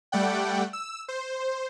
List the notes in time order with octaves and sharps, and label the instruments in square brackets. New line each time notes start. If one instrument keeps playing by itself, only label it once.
[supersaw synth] G3 A3 D5 F#5 G5
E6
C5